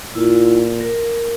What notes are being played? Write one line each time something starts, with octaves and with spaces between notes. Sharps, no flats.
A#2 E4 F4
A#4